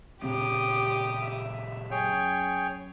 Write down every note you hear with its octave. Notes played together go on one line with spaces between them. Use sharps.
A#2 C#3 C4 G4 D6 D#6
E5
F#2 G#4 C#5 G5